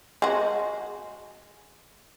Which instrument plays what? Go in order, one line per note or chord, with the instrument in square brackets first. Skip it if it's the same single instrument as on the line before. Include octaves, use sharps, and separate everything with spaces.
[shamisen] G#3 F#4